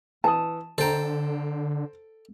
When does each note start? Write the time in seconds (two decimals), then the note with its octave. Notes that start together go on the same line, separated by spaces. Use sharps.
0.24 E3 A5 D#6
0.78 D3 A4 C5 G5 A#5